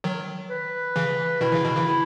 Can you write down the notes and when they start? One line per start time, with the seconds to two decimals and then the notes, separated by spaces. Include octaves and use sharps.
0.04 D#3 F#3
0.50 B4
0.96 C#3 E3
1.41 B2 D#3 E4
1.52 C#3 E3
1.64 B2 D#3
1.76 C#3 E3
1.87 E4